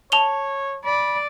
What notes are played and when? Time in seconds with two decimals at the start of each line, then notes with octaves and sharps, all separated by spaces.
0.12 C#5 A5 F7 G7
0.85 D5 B5